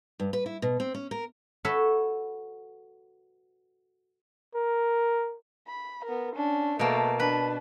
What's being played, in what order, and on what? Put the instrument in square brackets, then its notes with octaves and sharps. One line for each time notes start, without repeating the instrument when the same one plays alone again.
[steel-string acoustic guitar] G2
B4
E4
B2
C4
C#4
A#4
[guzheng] F#4 A4 B4 C#5 E5
[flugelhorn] A#4
[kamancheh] B5
B3 A#4
C#4 D4
[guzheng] B2 A#3 [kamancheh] A3 A5
[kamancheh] D4 A5 [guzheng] B4